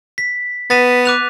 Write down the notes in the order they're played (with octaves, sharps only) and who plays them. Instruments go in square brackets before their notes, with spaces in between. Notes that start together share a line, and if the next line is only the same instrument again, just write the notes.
[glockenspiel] B6
[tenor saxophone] B3 [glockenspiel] A6 B6 D#7
[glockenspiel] D6 F#6 F7